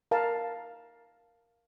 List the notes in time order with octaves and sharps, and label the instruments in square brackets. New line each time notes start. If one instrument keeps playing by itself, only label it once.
[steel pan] A#4 F5 A5